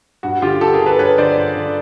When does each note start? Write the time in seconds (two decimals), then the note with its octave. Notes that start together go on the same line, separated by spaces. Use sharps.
0.23 G2 F#4
0.42 D3 F4 G4
0.61 G2 G4 A4
0.74 G#4 A#4
0.81 D3
0.86 A4 B4
0.99 G2 B4 C#5
1.18 D3 C5 D5
1.37 G2
1.56 D3